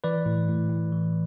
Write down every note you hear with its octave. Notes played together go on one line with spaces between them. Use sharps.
E3 B4 D5
A2
A2
A2
E3